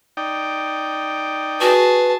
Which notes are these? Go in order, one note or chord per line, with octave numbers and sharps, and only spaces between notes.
D#4 D5 G5
F#4 G#4 B4 A5